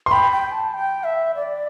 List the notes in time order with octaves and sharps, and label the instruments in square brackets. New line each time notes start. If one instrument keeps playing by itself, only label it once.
[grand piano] C6
[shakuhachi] G5 [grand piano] B5
[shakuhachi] G5
A5
G5
E5
D5